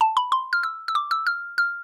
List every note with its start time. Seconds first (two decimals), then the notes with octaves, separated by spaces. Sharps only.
0.01 A5
0.17 B5
0.32 C6
0.53 F6
0.63 E6
0.88 E6
0.95 D6
1.11 E6
1.27 F6
1.58 F6